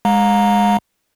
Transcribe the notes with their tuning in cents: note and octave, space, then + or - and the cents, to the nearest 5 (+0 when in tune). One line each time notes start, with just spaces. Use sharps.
G#3 -15 F5 +40 A#5 +0